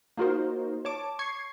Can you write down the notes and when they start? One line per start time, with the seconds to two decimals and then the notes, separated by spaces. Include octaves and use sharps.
0.17 A#3 D#4 F4 F#4 A#4 C5
0.85 C#5 A5 D6
1.19 C#6 G#6 C7